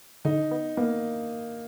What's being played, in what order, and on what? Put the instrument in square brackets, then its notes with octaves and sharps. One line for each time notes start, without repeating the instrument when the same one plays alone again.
[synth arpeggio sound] D3 [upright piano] D#4
[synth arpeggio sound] B3
[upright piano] A#3 [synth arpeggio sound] B3